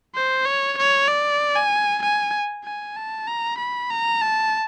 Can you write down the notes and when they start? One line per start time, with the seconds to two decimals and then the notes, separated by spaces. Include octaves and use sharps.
0.15 C5
0.45 C#5
0.77 C#5
1.08 D5
1.56 G#5
2.02 G#5
2.64 G#5
2.96 A5
3.27 A#5
3.58 B5
3.90 A#5
4.21 A5